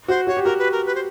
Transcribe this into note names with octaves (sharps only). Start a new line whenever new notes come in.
F#4 C5
F#4 C#5
G4
F#4 A#4
B4
A#4
B4
C5